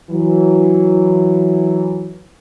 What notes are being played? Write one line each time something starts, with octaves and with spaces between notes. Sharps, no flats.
E3 F#3